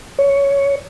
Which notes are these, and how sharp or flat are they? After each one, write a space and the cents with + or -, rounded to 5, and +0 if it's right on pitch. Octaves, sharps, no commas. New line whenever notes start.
C#5 +10